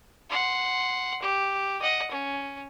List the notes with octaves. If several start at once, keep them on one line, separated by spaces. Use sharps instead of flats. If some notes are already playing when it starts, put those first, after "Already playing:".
F#5 C6
G4
D#5 F#5
C#4